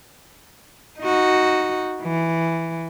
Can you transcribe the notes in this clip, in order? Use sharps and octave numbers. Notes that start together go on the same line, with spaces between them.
D#4 F#4
E3